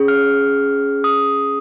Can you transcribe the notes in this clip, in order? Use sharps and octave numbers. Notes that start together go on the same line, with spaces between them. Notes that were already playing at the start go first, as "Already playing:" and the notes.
Already playing: C#4 G#4
F6
D#6